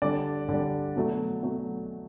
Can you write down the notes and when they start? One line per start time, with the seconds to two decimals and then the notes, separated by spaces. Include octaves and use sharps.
0.02 D3 G3 D5
0.49 D3 G3
0.96 B2 F#3 A3
1.43 B2 F#3 A3